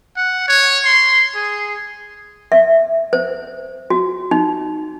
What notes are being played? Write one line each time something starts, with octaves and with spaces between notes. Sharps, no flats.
F#5
C#5
C6
G#4
E5
C5
F#4
D#4